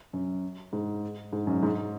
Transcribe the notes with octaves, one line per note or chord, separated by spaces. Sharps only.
F#2
G#2
G#2
F#2
G#2